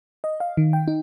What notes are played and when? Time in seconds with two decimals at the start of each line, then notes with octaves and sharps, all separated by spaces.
0.24 D#5
0.40 F5
0.57 D#3
0.73 G5
0.88 D#4